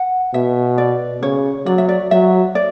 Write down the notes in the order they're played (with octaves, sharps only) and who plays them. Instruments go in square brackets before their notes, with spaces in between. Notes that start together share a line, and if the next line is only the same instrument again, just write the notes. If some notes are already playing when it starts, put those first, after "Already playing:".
Already playing: [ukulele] F#5
[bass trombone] B2 [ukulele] E5
[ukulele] D5
[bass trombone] C#3 [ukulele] C#5
[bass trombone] F#3 [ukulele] D5
[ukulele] E5
D5
[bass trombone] F#3 [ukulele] E5
[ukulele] D5